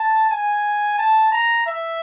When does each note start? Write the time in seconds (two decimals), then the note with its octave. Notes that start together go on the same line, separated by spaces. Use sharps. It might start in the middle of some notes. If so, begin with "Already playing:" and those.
Already playing: A5
0.30 G#5
0.98 A5
1.32 A#5
1.67 E5